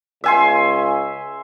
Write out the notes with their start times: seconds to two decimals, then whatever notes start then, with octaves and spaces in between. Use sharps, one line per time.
0.24 C#2 E5 G#5 C6